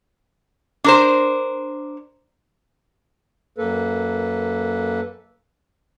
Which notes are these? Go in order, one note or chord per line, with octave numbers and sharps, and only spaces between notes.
D4 A#4 C5
F#2 A#3 A4 B4